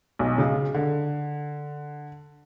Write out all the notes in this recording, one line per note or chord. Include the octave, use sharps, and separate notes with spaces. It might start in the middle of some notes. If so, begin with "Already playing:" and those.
B1
C#3
D3